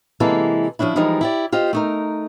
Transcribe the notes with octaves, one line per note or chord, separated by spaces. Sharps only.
C3 E3 G#3 A#3 E4 A4
F3 A#3 C#4 D4 E4
E3 F3 G3 G#3 D#4 A#4
E4 G4 D5
F4 G4 C5 D#5
A3 D#4 A#4